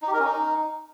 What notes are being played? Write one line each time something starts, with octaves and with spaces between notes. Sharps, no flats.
D#4
G4
A#4
C#4
D#4